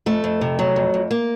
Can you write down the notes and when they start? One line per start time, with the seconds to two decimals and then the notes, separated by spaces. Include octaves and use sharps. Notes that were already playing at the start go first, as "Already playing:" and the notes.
0.06 F2 A3
0.24 F2
0.41 C3
0.59 F#3
0.76 F2
0.94 F2
1.11 A#3